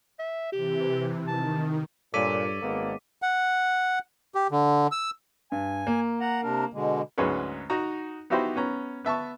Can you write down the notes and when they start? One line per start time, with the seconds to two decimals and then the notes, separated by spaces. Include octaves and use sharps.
0.19 E5
0.52 C3 E3 G4
1.27 D#3 A5
2.14 G2 A#2 A4 C#5 D5 D6 B6 D#7
2.62 G#1 G#3 A#3 B3
3.22 F#5
4.35 G4
4.51 D3
4.92 E6
5.52 G2 G#5
5.87 A#3
6.21 F#5 A#5
6.43 C3 D4 A#4
6.73 B2 D3 G#3
7.18 D2 G#2 F#3 G#3 C#4 B4
7.70 D#4 F#4 A#5
8.30 B3 D#4 E4 F#4 G4 C5
8.56 B3 C#4 A#5
9.05 B3 E5 A5 C#6